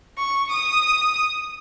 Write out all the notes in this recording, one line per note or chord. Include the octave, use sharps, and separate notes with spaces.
C#6
D#6